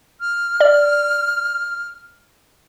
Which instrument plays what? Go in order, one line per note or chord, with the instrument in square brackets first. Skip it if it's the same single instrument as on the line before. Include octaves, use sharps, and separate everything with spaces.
[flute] F6
[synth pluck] D5